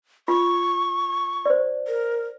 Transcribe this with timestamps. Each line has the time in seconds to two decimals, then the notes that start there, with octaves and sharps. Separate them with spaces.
0.28 F4 C#6
1.46 C5 D5
1.88 A#4